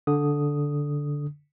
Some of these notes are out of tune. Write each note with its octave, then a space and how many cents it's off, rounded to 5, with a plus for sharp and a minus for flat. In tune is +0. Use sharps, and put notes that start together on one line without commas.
D3 -10 D#6 +0